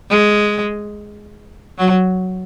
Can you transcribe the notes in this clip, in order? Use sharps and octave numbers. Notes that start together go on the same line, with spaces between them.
G#3
F#3